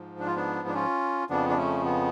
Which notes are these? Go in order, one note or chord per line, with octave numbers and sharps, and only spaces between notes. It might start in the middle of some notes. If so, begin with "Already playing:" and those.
Already playing: G#2 F3
D4
F4
B3 D4
D4
C#4 F4
F2 C#3 F3 B3 D4
D4
A3 C#4
B3